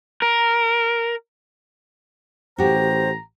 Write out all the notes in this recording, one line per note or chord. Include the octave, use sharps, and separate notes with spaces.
A#4
A1 F#4 G4 C5 A#5